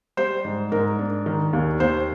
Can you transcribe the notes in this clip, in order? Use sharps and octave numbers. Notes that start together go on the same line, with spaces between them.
G3 C5
G#2
G#2 A#4
D4
D#3
D#2
D#2 C5